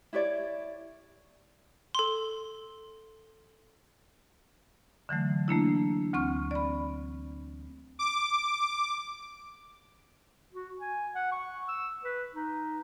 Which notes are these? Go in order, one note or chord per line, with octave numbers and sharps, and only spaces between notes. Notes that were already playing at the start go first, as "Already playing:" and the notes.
E4 G4 C#5 D5
A4 C6
D3 E3 F#3 A3
A3 A#3 D4 E4
D2 C4 C#6 F6
D5 B5
D6
F#4
G#5
F#5
C#6
E6
B4
D#4